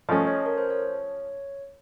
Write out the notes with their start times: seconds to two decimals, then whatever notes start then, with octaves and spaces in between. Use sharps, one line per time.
0.09 F3 A3 C#4 D#5
0.27 C#5
0.46 A#4
0.58 C5
0.70 C#5